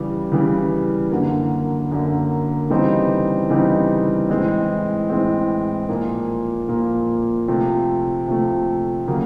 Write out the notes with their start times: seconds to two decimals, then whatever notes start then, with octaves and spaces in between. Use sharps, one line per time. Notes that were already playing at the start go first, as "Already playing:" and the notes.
Already playing: C#3 E3 G3
0.32 C#3 E3 G3
1.11 F#2 D3 F#3 A#3
1.91 F#2 D3 F#3 A#3
2.70 C#3 E3 G3 C4 D#4
3.50 C#3 E3 G3 C4 D#4
4.30 A2 E3 G#3 C4
5.10 A2 E3 G#3 C4
5.89 A#2 F3 A#3
6.68 A#2 F3 A#3
7.48 C3 F3 A3
8.28 C3 F3 A3
9.07 C#3 F#3 A#3